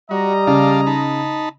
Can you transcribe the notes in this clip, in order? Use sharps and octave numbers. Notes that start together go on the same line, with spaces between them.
G3 F#4 D#5 A#5
C#3 D5 F5 A5
D#4 A5 B5